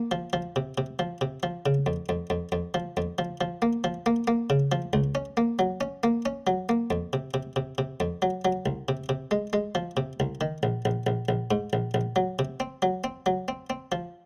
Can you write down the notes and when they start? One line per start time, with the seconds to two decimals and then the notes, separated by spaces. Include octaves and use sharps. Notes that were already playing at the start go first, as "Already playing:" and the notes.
Already playing: A#3
0.11 F3
0.33 F3
0.56 C3
0.78 C3
0.99 F3
1.21 C3
1.43 F3
1.66 C#3
1.86 F2
2.09 F2
2.30 F2
2.52 F2
2.74 F3
2.97 F2
3.18 F3
3.41 F3
3.62 A#3
3.84 F3
4.06 A#3
4.28 A#3
4.50 C#3
4.72 F3
4.93 C#2
5.15 C#4
5.37 A#3
5.59 F#3
5.81 C#4
6.03 A#3
6.26 C#4
6.47 F#3
6.69 A#3
6.90 F2
7.13 C3
7.34 C3
7.56 C3
7.78 C3
8.00 F2
8.22 F#3
8.45 F#3
8.66 C2
8.89 C3
9.09 C3
9.31 G#3
9.53 G#3
9.75 F3
9.97 C3
10.20 C2
10.41 D#3
10.63 A#1
10.85 A#1
11.07 A#1
11.29 A#1
11.51 G#2
11.73 A#1
11.94 A#1
12.16 F#3
12.39 C3
12.60 C4
12.82 F#3
13.04 C4
13.26 F#3
13.48 C4
13.70 C4
13.92 F3